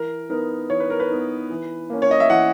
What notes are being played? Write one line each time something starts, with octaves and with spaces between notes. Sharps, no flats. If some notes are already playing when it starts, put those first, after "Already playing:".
Already playing: E3 A#4
B3 D#4 A#4
E3 C#5
B4
A#4
B4
B3 D#4
E3
A#3 C#4
C#5
D#5
E5
E3 F#5